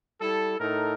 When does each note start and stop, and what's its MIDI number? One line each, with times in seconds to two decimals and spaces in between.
0.21 0.58 55
0.21 0.58 64
0.21 0.58 69
0.59 0.94 45
0.59 0.94 63
0.59 0.94 69
0.59 0.94 70